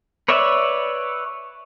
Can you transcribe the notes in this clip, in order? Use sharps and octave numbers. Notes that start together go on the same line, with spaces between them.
B4 C#5 D5 E5